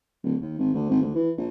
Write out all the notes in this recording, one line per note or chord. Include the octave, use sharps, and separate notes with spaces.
D1
D#2
G#1
D2
G#1
D2
E3
A#1